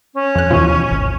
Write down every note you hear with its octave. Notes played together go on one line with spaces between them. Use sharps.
C#4
F2 F#6
D#2 B2 E3 F3
G#1 D2